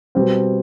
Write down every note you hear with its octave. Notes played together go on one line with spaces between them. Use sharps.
B2 G3 C4